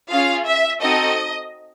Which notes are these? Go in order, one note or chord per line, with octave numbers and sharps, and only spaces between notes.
C#4 F4 G#4 F5
E5
C4 D#4 F#4 A4 D#5